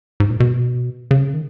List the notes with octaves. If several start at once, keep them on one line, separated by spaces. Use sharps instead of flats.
G#2
A#2
B2
C#3
D#3